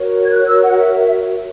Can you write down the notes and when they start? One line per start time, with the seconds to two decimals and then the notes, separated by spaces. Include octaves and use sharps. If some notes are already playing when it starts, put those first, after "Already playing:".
Already playing: F#4 A#4 C#5
0.24 G#6
0.32 F#6
0.46 E6
0.62 F#5
0.77 E5